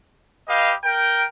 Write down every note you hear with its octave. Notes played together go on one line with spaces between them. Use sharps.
G4 B4 D#5 F5
A#4 G5